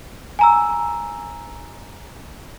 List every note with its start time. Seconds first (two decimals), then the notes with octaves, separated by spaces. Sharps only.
0.39 G#5 A#5 E6